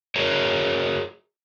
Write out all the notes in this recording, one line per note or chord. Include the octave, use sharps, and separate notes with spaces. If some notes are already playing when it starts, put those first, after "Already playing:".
F#4 G#4 A#4 C#5